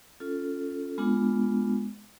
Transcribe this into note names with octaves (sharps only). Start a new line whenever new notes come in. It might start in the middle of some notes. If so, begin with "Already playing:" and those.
C#4 F4 A4
G#3 B3 D4 F4